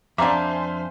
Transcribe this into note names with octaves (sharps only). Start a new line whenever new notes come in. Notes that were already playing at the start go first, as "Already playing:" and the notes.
F2 D4 C5 E5 F5 G#5 A#5 D6